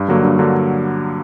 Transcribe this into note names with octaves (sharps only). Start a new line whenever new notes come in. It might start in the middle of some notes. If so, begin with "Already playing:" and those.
Already playing: G2
D3 F#3 A#3
G2
D3 F#3 A#3